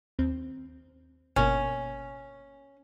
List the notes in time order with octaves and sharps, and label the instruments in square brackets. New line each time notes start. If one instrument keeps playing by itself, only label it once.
[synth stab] D#2 C4
[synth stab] G1 B2 A#3 [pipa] C#4